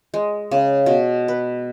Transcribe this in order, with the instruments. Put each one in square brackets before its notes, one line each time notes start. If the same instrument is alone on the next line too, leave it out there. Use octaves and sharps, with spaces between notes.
[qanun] G#3
C#3
B2
B4